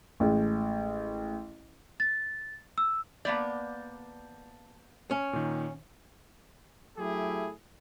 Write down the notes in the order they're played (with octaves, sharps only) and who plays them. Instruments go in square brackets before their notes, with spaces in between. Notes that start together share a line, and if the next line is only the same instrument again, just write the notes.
[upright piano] A1 G#3
[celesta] A6
E6
[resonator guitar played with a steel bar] A#3 B3 D5 [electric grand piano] A5 G6
[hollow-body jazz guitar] C#4
[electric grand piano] A#2 D#3
[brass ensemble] F#3 A3 E4 G4 G#4